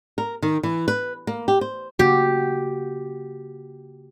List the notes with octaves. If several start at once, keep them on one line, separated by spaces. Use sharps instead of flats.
A#4
D#3
E3
B4
A#3
G4
C5
C#3 A#3 F#4 G4